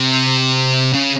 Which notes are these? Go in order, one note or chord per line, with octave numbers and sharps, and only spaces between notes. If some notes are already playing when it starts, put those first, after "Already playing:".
Already playing: C3
C#3